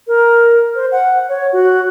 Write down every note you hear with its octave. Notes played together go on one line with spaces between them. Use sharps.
A#4
C5
F#5
C#5
F#4